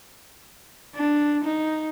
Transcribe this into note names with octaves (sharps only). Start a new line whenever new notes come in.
D4
D#4